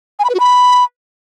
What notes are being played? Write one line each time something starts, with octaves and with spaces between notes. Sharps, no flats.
G#5
B5
B4
F#4
B5